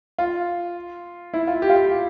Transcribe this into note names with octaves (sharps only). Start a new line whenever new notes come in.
F4
E4
F4
G4
F4
G4